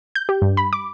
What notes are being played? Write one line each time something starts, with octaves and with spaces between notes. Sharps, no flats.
G6
G4
G2
B5
D6